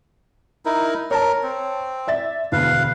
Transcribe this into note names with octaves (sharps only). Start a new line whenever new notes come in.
D#4 E4 A#4
A#4 C#5 A5
C4
D5 E5 A6
E1 D2 B4 F5